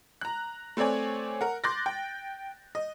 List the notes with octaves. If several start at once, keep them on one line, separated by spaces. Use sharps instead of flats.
A#5 F#6
A3 C4 C#5 D5 G#5
A#4 F#5
C6 D6 F#6 G6 A6 A#6
G5
D#5